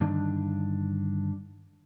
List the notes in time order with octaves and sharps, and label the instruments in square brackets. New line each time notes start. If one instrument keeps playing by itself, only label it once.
[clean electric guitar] G2 D3 D#3 D4